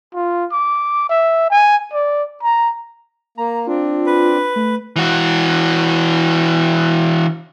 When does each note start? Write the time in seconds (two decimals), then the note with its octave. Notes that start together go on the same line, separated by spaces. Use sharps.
0.14 F4
0.52 D6
1.10 E5
1.51 G#5
1.93 D5
2.43 A#5
3.38 A#3 A#5
3.67 C4 D4 F4
4.06 B4
4.56 A3
4.96 E3 F#4